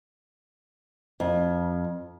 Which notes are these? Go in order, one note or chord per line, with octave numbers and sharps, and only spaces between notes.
F2